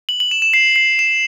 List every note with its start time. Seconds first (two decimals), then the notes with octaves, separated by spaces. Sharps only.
0.09 F#7
0.20 F#7
0.31 E7
0.42 E7
0.54 C7
0.76 C7
0.99 E7